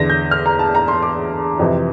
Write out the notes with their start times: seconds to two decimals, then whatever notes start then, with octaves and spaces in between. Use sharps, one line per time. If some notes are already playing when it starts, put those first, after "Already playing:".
Already playing: E2 D3 A#6
0.10 G6
0.31 F6
0.46 A#5
0.59 A5
0.75 A#5
0.88 C6
1.02 D6
1.59 F2 C3 E3